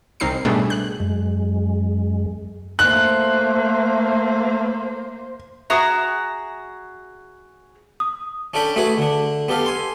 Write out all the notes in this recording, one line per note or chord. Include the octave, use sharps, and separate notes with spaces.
C2 C4 D#4 A#4 C7
G#2 B2 G3 A3 D4 G#4
F#6
F#2 G#3
A3 A#3 C5 F#6
F#4 G#4 E5 A#5 D#6
D#6
C#4 D4 A4 F#5 G5 B5
A3 F#4 G#4 B4 F#5 G#5
D3 D4
B3 G4 A4 F5
G#5 C6